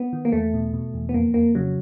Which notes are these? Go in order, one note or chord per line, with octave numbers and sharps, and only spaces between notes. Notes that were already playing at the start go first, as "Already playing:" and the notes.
Already playing: B3
D#3
A#3
E2 A3
B2
B2
E2
B3
F2 A#3
F2 A#3
C#3 F#3